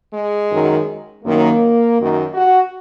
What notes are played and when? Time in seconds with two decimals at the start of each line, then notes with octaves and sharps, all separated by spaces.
0.13 G#3
0.50 F#2 D#3 F#3
1.24 F#2 D#3 F#3 A#3
1.97 F#2 D#3 F#3
2.34 F#4